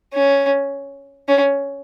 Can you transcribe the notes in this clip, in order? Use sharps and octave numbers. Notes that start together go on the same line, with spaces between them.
C#4
C#4